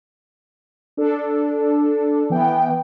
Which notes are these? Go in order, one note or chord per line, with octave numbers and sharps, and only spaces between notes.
D4 A4
E3 B3 G5